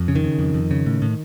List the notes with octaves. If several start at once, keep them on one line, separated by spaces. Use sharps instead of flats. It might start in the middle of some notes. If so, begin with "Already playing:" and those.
Already playing: F2
C#3
D#3
C#3
F2
F2
C#3
A2
A2